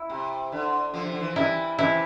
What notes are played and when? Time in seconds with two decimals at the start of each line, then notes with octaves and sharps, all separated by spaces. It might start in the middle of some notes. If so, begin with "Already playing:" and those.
Already playing: E4
0.09 C3
0.52 D3
0.94 D3 F3
1.05 C3
1.12 D3
1.20 E3
1.28 F3
1.35 E3 G3 E4
1.78 C3 E3 E4